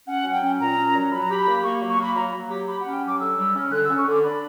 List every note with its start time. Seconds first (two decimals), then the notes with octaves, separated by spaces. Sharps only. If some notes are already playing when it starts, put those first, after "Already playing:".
0.07 C#4 F#5
0.24 F#3
0.33 G5
0.41 C#4
0.60 A#2 A#5
0.77 C#4
0.95 F#3
1.11 F#3 B5
1.22 A#5
1.29 G4 B5
1.47 A#3
1.63 A#3 C#6
1.81 F#3
1.90 C#6
1.98 A#3 B5
2.16 F#3 A#5
2.32 F#3
2.50 G4
2.67 G4 B5
2.81 C#4 F#5
2.93 G5
3.02 F#3
3.07 D6
3.20 D3 E6
3.37 G3
3.55 C#4
3.72 D3 F#6
3.84 E6
3.90 C#4
3.98 C#6
4.07 D3 D6
4.24 D4 B5